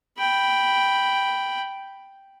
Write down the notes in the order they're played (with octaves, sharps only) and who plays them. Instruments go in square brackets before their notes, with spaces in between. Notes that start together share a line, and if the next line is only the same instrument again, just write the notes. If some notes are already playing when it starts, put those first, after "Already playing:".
[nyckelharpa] G5 B5